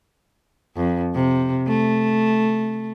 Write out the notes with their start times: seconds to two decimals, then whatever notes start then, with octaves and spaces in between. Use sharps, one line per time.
0.76 F2
1.15 C3
1.67 A3